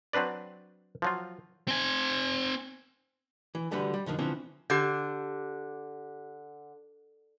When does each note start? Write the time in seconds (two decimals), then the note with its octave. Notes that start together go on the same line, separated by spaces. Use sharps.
0.13 F#3 C4 D4 B4 D5
1.02 F3 F#3 F4
1.68 C4 G#5
3.55 E3
3.71 D2 D3 G3 F#4 G4 B4
3.94 G3
4.06 F2 D3 D#3 F3
4.19 D3 E3 F3 C4 C#4
4.70 D3 G4 D6 G6